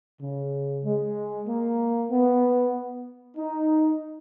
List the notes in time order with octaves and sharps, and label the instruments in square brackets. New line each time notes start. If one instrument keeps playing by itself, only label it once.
[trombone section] C#3
G#3
A#3
B3
D#4